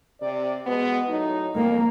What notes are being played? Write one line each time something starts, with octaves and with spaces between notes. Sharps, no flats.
C3 D5
B2 G#3 B3
A2 F#3 D#4
F2 A#3